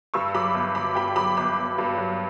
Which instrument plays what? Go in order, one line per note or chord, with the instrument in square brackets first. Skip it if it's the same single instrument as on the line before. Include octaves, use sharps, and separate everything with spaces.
[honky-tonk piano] G2 C#6 E6
F#3 B5 D6
G1
G1 B5 D6
G2 G5 B5
F#3 B5 D6
G1 B5 D6
G1
G2
F#3